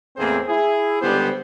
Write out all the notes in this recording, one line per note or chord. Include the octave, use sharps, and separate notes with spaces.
E2 A2 A#3 C4 G#4 C5
E4 G#4
C#2 D3 G3 B3 G4 C5